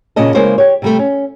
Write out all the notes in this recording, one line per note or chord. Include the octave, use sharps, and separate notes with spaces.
A#2 C#3 C#4 D#5 A5
C#3 G#3 A#3 E4 C5 C#5
G4 C#5
C3 G3 A3
C#4